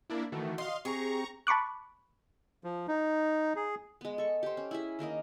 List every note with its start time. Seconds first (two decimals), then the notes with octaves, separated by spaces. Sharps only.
0.10 A#3 D4 E4
0.32 D#3 E3 A3 F#4
0.58 D#5 F5 C6
0.85 C4 G4 G#4 A#5 C#6
1.47 A5 B5 C#6 D6 F#6
2.64 F3
2.88 D#4
3.56 G#4
4.01 G#3 B3
4.18 A4 C#6
4.43 G4 C5
4.57 C#4
4.71 E4 G#4 E5
4.99 D#3 A#3 A#4 D#5